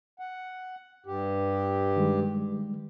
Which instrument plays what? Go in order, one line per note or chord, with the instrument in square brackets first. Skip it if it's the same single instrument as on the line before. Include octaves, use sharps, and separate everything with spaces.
[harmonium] F#5
G2 G4
[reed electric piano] D#3 G3 G#3